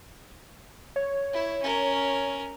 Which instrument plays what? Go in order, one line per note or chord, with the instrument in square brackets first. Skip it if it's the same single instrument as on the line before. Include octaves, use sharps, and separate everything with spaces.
[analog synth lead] C#5
[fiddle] E4
C#4 A#4